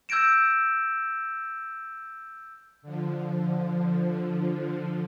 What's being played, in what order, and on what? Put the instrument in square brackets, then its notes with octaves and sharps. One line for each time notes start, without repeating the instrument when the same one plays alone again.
[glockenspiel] E6 G6 G#6 A#6 D7 E7
[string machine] D3 F3